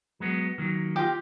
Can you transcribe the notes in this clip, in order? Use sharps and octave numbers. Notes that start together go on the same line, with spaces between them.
F#3 G#3 B3
D#3 F#3 A#3
F4 G4